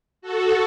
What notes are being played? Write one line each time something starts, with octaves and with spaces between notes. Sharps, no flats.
F#4 A4